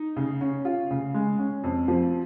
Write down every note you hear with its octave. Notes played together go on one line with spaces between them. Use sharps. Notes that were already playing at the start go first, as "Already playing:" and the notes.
Already playing: D#4
C#3
C#4
F4
C#3
G#3
C#4
F2
F3